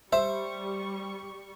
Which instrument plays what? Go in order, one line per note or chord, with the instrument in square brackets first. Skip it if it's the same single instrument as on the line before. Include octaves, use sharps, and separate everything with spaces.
[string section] G3 C#6 [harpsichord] C5 [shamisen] E5